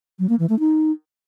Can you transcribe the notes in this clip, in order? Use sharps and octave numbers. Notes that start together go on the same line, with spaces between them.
F#3
A#3
E3
A3
D#4